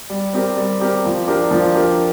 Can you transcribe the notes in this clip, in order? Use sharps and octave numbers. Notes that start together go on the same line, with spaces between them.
G3
C4 G4 A#4
G3
C4 G4 A#4
F3
D4 G4 A#4
F3
D4 G4 A#4